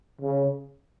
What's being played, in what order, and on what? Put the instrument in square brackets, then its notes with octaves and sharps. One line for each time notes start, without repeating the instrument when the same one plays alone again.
[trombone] C#3